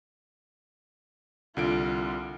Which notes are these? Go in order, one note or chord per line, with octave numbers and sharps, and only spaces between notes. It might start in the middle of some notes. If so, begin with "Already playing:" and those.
C2 D3 F4 D7